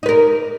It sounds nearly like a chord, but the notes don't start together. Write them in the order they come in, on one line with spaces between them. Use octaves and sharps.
D#4 B4 A#4